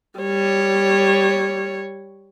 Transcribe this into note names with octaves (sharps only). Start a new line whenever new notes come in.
G3 C#5